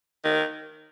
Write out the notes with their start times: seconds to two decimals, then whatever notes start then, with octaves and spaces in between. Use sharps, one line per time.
0.24 D#3